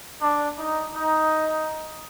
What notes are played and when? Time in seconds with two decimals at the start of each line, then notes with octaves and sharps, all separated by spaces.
0.21 D4
0.58 D#4
0.94 D#4